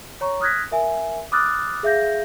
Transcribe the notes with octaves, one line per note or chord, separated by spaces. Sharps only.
C#5 A#5 C#6
D#6 F6 F#6 G#6 A#6 B6
A#4 E5 G#5
B5 D6 D#6 F6 F#6 A6
G#4 E5 F5 G6 A#6